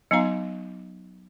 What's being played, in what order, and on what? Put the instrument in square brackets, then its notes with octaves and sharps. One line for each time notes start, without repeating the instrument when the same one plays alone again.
[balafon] F#3 B3 D#4 F5 A#5